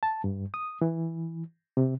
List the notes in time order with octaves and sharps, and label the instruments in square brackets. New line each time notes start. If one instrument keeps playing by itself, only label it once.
[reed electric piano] A5
G2
D#6
E3
C3